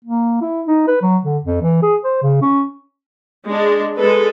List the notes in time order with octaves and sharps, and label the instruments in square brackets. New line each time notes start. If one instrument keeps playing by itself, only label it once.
[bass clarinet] A#3
E4
D#4
B4
F#3
D3
F2
E3
G#4
C5
C#3
C#4
[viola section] G#3 D4
G#3 A4 B4